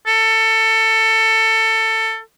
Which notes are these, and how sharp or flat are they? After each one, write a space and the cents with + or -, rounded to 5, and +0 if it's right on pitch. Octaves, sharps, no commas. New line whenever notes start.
A4 +20